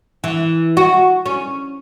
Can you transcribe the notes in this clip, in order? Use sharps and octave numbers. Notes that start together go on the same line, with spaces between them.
E3
F#4
C#4